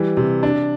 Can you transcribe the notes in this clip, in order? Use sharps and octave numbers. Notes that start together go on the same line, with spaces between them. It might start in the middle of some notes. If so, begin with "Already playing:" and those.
Already playing: E3 G3
C3
D4